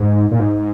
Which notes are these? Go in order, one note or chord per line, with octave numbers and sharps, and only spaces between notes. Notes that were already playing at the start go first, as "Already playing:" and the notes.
Already playing: G#2
A#2
G#2